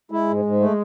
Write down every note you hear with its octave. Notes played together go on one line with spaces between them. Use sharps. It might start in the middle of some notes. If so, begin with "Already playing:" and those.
G#3 E4
G#2
G#2
A3